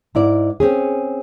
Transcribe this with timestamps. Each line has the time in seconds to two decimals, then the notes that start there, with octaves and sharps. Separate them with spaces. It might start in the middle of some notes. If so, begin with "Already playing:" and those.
0.15 G#2 E4 D5
0.60 C4 C#4 G#4